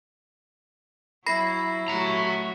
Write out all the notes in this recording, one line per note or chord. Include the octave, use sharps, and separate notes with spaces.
F#3 E4 B5 A#6 C7
F#3 A3 F#4 E5 A#5